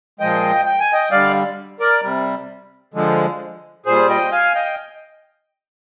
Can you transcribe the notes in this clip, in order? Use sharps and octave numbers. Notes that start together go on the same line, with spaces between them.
A#2 F3 G#3 D#5 G5
G5
G#5
D#5 G5
D3 G3 D5 F5
A#4 D5
C3 G3
D3 F3 G#3
A#2 G3 G#4 C5
D#5 G5
F5 G#5
D#5 G5